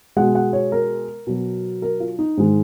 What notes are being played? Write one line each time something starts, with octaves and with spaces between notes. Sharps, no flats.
B2 G#3 F#5
F#5
C#5
A#4
B2 F#3
A#4
F4
D#4
G#2 D#3 G#3